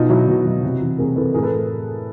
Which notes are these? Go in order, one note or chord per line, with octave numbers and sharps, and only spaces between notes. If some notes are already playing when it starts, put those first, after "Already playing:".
Already playing: B2 D#4 F4
F#3 E4 F#4
B2
F#3
C3
E3
C3 G#4 A#4
E3 A4 B4
A2 G#4 A#4
A4 B4